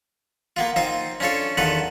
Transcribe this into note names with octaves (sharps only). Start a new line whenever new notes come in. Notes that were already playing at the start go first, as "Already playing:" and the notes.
A#3 B3 F4
C4 D#4 F4 C5
C#4 D4 F4 A4 C#5
E2 D#3 F4 A4 B4 F#5